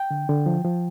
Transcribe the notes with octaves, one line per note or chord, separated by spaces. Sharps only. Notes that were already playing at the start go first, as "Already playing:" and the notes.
Already playing: G5
D3
D3
F3
F3